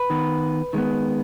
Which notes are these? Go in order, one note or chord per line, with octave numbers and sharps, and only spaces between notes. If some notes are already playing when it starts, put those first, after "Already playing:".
Already playing: B4
D#3 B3
D#3 G#3 B3